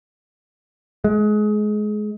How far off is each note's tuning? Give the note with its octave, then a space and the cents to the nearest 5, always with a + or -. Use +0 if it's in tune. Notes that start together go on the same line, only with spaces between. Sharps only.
G#3 +25